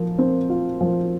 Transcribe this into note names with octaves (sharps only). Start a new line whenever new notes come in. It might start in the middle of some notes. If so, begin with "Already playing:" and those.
Already playing: F3 A#4
C4
F4
F3